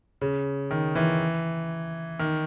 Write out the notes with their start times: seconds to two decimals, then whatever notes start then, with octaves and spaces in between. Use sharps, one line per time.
0.21 C#3
0.71 D#3
0.95 E3
2.19 D#3